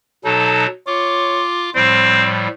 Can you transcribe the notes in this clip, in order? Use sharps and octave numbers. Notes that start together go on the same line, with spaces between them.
B2 F#3 D#4 A4
F4 C#5 D6
A2 F3 G3 C4